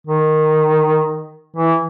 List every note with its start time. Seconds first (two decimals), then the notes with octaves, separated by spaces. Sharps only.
0.07 D#3
1.57 E3